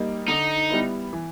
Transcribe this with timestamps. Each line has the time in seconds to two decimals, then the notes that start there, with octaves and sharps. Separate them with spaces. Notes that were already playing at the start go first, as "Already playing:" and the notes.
Already playing: G3 A#3 D#4
0.28 D3 D#4
0.69 G3 B3 E4
1.13 E3